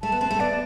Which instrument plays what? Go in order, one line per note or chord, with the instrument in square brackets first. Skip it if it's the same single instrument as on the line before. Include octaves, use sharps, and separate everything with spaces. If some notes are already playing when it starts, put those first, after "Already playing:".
[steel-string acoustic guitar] A3 [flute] A5
[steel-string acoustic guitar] B3
[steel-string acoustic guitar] C4 [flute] A5
[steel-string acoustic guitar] A3
[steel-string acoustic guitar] B3 [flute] D5